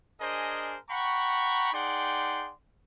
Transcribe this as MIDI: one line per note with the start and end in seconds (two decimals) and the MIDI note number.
0.20 0.78 62
0.20 0.78 68
0.20 0.78 70
0.20 0.78 72
0.20 0.78 75
0.20 0.78 80
0.90 1.70 78
0.90 1.70 79
0.90 1.70 82
0.90 1.70 83
0.90 1.70 85
1.73 2.53 63
1.73 2.53 68
1.73 2.53 74
1.73 2.53 78
1.73 2.53 79
1.73 2.53 84